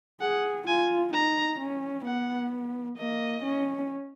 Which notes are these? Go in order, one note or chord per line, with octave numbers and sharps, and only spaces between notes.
G#4 F#5
F4 G#5
D#4 A#5
C#4
B3 F#5
A#3 D#5
C#4